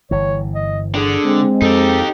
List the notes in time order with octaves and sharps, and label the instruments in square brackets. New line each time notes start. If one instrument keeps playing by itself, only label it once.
[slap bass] G1 E3 [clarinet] C#5
[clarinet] D#5
[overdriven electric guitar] D3 [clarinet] G#4
[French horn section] G#3 C4
[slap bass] F2 [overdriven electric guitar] D#4 G4 [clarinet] A4